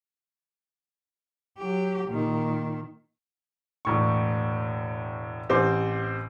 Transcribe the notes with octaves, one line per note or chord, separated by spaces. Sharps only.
F#3 G4
A#2 D#3
E1 A2 C#6
A1 C4 G4 C5 D6